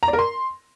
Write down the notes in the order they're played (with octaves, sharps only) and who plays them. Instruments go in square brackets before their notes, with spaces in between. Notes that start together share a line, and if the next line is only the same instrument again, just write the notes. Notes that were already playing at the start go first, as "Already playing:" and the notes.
[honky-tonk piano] A#5
D5
A#4
C6